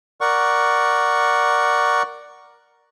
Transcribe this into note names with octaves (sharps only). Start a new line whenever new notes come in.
A#4 D5 F#5 C#6